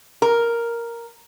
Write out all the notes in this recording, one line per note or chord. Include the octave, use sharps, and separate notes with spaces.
A#4